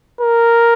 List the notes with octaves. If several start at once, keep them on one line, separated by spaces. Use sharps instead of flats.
A#4